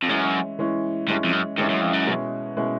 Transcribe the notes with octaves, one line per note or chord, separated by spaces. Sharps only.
F2
F#2 E3 G#3 C#4 E4
E3 G#3 C#4 E4
G2 E3 G#3 C#4 E4
F2
F#2
G2 E3 G#3 C#4 E4
F#2
F2
F#2
B2 G#3 C#4 E4
B2 G#3 C#4 E4